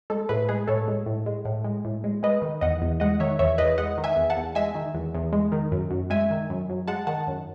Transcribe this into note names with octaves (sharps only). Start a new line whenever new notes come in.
G#3 A4
A2 G#4 B4
G#3 G#4 B4
A2 A4 C#5
G#3
A2
G#3
A2
G#3
A2
G#3
G#3 B4 D#5
D#3
E2 D#5 F#5
E2
G#3 D#5 F#5
D#3 C#5 E5
E2 C#5 E5
E2 B4 D#5
G#3 D#5 F#5
D#3
E5 G#5
E2
F#5 A5
E2
G#3 E5 G#5
D#3
E2
E2
G#3
D#3
F#2
F#2
G#3 E5 G#5
D#3
F#2
F#2
G#3 F#5 A5
D#3 F#5 A5
F#2